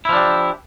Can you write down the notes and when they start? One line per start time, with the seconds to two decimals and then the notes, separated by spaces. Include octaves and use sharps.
0.05 E4
0.09 F3
0.13 D4
0.17 G4